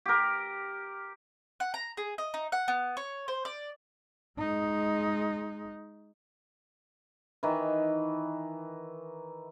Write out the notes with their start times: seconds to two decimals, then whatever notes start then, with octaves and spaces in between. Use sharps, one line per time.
0.06 G4 A#4
1.60 F#5
1.74 A#5
1.97 G#4
2.18 D#5
2.34 D#4
2.52 F#5
2.68 B3
2.97 C#5
3.28 C5
3.45 D5
4.39 G#3 D#4
7.43 D#3 E3